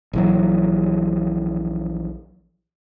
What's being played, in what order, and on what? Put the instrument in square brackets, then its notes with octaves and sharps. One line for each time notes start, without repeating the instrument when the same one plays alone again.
[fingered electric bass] A#1 E3 F#3